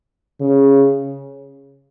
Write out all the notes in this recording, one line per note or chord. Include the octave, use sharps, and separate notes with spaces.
C#3